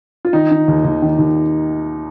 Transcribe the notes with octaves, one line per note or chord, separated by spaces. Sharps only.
F4
D#3 D#4
D#3
D#2
D#2
D#3
D#2